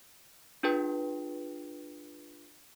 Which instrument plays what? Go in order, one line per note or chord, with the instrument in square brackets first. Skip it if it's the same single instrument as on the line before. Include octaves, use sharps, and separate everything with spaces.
[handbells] D4 F4 G#4 B4 G5